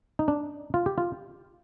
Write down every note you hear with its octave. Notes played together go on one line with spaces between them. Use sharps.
D#4
D4
F4
G4
F4